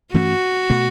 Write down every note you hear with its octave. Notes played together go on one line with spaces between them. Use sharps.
G2 E3 A3 C#4 F#4
B2 A3